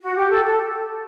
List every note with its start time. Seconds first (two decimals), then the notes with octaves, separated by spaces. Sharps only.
0.01 F#4
0.16 G4
0.30 A4
0.44 A4